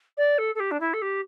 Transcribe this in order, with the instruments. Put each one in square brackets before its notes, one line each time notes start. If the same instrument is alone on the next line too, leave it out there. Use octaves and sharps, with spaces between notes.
[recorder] D5
A4
A4
G4
D4
E4
A4
G4